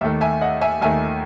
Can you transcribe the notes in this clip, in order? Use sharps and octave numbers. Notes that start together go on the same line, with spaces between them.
D#2 D#3 A3 E5
E5 G#5
D#5 F#5
E5 G#5
D#2 D#3 A3 E5 G#5